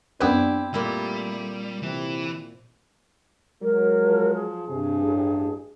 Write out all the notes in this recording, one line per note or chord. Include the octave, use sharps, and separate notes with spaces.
F#2 B3 C4 D4 E4 G4 B4
A#2 G3 A3 E4
C3 E3
F#3 G#3 A#4
F3
G#4
G2 C3
A1